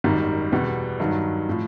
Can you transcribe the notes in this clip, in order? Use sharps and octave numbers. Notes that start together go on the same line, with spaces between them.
G#1 F#2 D#3 G3
E2 B2 G3 B3
G2 D#3 F#3
A2 F3